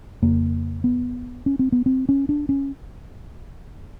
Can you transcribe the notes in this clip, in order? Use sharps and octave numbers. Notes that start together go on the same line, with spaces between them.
F2 C#3 A#3
B3
C#4
C4
B3
C4
C#4
D4
C#4